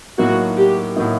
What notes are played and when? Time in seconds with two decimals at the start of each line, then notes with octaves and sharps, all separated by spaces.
0.18 A2 F#3 A#3 D#4 F#4
0.57 G4
0.96 A2 F#3 A#3 D#4